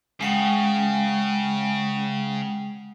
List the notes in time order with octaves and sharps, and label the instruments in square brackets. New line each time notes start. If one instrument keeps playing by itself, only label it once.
[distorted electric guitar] C#3 [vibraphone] G#3 F#5 G5